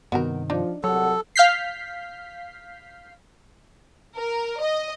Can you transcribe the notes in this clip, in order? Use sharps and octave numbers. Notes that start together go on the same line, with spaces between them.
G2 C3 D#3 B3 F#4 A#4
F3 D4 D#4
C2 F#3 A4 C#5 F#5
F5 F6 G6 B6 C7
A#4
D#5